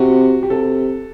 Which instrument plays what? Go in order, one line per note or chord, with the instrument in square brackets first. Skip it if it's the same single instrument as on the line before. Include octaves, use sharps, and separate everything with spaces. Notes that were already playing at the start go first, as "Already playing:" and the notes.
Already playing: [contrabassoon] C3 [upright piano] F#4
[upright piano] G4
[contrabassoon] C3 [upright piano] A4